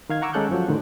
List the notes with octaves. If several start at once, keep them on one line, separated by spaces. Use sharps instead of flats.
D#3 F5 G#6
F#5 A#5 C#6 D6 E6
G#3 C#4 A4 F#6 G6
F#2 F3 F#3
A2 D3 D#3